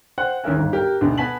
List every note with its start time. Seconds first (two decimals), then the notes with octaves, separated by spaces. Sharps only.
0.18 C5 F#5 G5 F#6
0.44 D#2 E3 C#4 A#4 E5 G#5
0.55 G1 G#2
0.73 G4 A#4
1.01 D2 G#2 B2 D3
1.18 B3 G#5 A5 B6 F#7